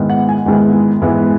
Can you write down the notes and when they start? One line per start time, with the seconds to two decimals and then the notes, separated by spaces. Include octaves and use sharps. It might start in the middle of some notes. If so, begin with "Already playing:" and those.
Already playing: G#2 D#3 G#3 B3 E4
0.10 F#5
0.29 G#5
0.46 G#2 D#3 G#3 B3 E4
1.02 G#2 E3 G#3 B3 E4